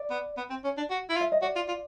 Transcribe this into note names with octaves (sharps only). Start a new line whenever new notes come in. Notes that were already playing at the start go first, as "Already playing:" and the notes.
Already playing: D5
B3
B3
C4
C#4
D4
F#4
E4
F4
E5
D#5
F#4 D5
F4
F4